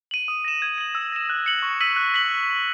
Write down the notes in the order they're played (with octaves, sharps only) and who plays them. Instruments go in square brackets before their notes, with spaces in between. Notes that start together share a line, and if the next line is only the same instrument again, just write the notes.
[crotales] D#7 F#7
D#6
A#6 E7
G#6
D#7 F#7
E6
A#6 E7
F#6
C#7 F#7
C#6
E6 B6 D#7 F#7
F#6
B6 D#7 F#7